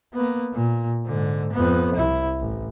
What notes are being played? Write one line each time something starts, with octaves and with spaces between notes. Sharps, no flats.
A#3 B3
A#2
G#2 D3
F2 B3
C2 E4
A1